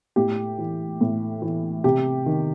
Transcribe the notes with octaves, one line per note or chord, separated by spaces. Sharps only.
A2 G4
E3
A2
E3
C3 G4
D#3